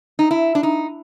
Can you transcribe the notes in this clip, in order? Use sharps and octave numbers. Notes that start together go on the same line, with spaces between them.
D#4
E4
D4
D#4